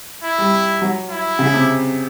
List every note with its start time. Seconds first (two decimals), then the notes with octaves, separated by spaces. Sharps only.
0.24 E4
0.38 G3
0.82 F#3
1.10 E4
1.39 C#3
1.54 C3